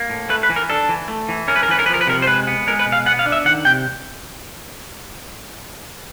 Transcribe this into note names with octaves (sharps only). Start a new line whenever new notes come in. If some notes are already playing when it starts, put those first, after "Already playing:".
Already playing: A#3
A2
A3 B4
B4
E3
A#4
D4 A4
E3
A3
E3
C#4 A#4
B4
A#4
E3 B4
A#4
F3 B4
A#4
B4
C3 A#4
C5
G#3 B4
B3
G#3 A#4
B4
B2
F5
B3 F#5
F5
D4
E5
D#3 F#5
C3 G5